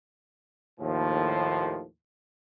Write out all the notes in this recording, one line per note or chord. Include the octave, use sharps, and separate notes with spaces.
D#2 A2 F3